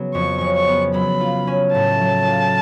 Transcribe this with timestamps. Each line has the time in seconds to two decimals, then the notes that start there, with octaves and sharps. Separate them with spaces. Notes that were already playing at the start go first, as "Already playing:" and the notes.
Already playing: C#3 F#3 B3
0.15 F2 C#6
0.41 C#3
0.55 C#6
0.67 B3
0.94 F#3 B5
1.21 F4
1.47 C#4
1.74 A2 A5
2.01 F#3
2.27 F4